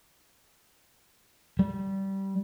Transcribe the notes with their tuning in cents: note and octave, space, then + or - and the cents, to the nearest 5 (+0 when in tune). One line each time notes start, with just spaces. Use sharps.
G3 -15